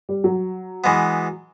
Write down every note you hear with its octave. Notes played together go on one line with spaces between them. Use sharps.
G3
F#3
E3 G#3 B3